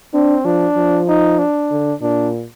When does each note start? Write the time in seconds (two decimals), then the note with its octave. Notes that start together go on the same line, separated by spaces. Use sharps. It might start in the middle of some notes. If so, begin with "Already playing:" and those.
0.14 C4 D4
0.45 F3 D4
0.76 F3
1.08 D#4
1.38 D4
1.70 D3
2.01 A#2 D4